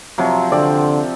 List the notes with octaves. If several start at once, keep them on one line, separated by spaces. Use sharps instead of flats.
C3 F3 F#3
D3 C4 D5